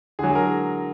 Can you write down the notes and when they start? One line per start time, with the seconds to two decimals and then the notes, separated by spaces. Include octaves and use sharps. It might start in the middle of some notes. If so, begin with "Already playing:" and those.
0.19 D3 F#3 G#4
0.29 G#4
0.35 A#4